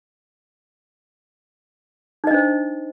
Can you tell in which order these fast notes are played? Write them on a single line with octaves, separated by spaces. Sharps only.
D#4 D#5 D4 C5